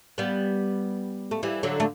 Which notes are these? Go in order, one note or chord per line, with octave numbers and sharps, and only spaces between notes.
G3 B3
A3
E3 G3
D3 F#3
A3